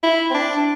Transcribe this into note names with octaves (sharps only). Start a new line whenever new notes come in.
E4
C4
D4